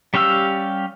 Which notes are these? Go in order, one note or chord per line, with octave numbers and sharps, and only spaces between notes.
G3 C#4 G4 F5 E6